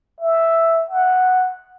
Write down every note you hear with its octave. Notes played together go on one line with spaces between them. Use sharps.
E5
F#5